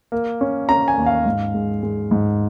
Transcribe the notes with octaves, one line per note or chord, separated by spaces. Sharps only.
A#3
C#4
C#4 A#5
G#5
D#2
F5
G#2
G#3
G#3
G#2